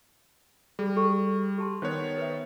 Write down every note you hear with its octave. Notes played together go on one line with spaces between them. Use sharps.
G3 G#4
G4 A4 C#6
G4 A5 C6
D#3 B3 C5 C#5 G5
B4 E5